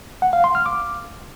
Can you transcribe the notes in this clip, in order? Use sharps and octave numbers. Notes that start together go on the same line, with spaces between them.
F#5
F5
C6
F6
D6